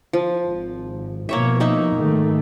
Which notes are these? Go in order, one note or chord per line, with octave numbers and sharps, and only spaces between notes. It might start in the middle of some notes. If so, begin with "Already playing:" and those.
F3
G#1
B2 F3 A#3 C#5 E5
A#3 D#4 E5
G#2 D#3 A3